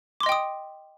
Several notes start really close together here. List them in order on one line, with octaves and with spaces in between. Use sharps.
D6 C6 D#5 G5 D#6